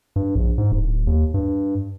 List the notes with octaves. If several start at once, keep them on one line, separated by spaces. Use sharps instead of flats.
G2
A#1
G#2
D1
D#2
G2